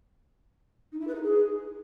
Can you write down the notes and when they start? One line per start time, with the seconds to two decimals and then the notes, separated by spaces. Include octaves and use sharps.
0.92 D#4
0.99 E4
1.07 B4
1.15 D#4
1.22 G#4